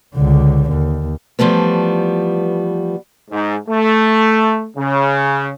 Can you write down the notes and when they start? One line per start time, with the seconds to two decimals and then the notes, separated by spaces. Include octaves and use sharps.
0.15 C#2 D3
0.70 D#2
1.39 E3 F3 G3 A3 B3
3.31 G#2
3.68 A3
4.77 C#3